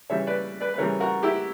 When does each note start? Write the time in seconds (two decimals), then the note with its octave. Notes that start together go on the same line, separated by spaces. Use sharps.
0.10 C#3 E3 G3 C#5 E5
0.27 B4 D5
0.60 B4 D5
0.74 B4
0.78 C#3 E3 G3 A#4 C#5
1.00 F#4 A#4
1.23 E4 G4